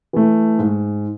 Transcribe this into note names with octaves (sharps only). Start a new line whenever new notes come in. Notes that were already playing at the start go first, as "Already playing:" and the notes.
E3 A3
G#2